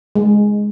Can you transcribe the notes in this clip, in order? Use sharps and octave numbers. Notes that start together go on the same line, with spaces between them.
G#3